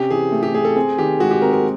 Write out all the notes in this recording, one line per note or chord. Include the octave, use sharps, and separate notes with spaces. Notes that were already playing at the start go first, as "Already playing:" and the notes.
Already playing: C3 C#4 G4
E3 G#4
A3
G4
A3 G#4
A4
C4 G#4
D#3 G4
G#3 F#4
G4
C4 A#4
A#4